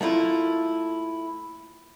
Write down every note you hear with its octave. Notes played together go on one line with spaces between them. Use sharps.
A3 A#3 E4 F4